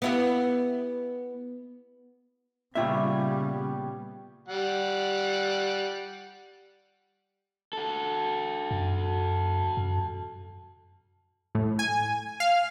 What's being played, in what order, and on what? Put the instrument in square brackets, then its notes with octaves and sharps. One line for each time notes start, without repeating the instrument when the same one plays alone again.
[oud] B3 E4 G4
[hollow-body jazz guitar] A#2 F4 E5 [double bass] C#3 G3 [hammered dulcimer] B3 G4 C#5
[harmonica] G3 F#5
[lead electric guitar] F#4 A4
[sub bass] F#2
F#2
[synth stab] A2
G#5
F5